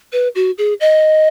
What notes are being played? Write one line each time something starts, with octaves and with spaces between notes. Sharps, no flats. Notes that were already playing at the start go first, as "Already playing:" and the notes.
B4
F#4
G#4
D#5